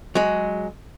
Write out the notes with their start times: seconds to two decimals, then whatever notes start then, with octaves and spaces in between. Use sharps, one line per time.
0.15 F#3 G#3